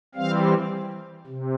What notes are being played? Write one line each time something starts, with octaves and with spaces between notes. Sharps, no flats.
E3 G3 C4 F5
C3